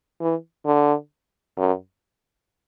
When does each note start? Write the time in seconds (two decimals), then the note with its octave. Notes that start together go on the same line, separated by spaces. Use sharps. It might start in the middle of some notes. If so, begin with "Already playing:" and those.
0.21 E3
0.66 D3
1.58 F#2